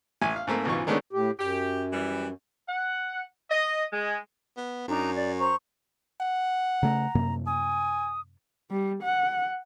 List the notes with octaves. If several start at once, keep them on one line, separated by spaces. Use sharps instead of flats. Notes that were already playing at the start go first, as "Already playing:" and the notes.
A1 G#5
F5
G#2 A3 A#3 C4
C#2 G#2 B2 E3 F4 C#6
D#3 G#3 A3 B3 C#4 D4
A2 G4
F#2 G4
E3 G3
F#5
D#5
G#3
B3
F#2 D4 D#4 A#5
D5
C5 A#5 C#6
F#5
C#3 A3 A#5
F#2 C3 A#3
G#5 D#6
G3
F#5